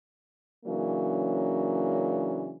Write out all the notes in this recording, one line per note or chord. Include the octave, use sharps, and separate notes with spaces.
C#3 E3 F#3 A#3 C#4 D4